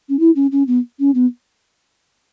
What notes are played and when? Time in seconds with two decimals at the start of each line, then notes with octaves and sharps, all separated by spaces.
0.09 C#4
0.20 E4
0.36 C#4
0.52 C#4
0.67 B3
1.00 C#4
1.15 B3